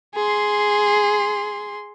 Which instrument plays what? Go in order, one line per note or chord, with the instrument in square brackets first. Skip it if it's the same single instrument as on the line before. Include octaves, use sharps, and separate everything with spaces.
[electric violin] G#4 C6